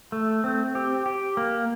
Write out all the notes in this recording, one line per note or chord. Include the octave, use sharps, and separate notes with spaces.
A3
C4
G4
G4
A#3